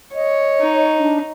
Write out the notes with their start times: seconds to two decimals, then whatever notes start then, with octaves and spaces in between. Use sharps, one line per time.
0.15 C#5 D#5
0.61 D#4
0.99 D4